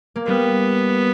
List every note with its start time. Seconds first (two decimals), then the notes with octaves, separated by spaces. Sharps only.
0.16 A#3
0.26 G3 B3